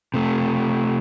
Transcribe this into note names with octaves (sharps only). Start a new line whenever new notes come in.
C3 A3